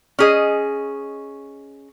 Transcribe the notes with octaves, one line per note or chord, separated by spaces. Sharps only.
C#4 G#4 D#5